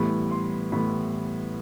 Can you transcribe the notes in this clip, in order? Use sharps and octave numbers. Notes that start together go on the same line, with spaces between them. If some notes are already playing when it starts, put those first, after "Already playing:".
Already playing: A2 E3 G3 B3 B5
C6
A2 E3 G3 B3 B5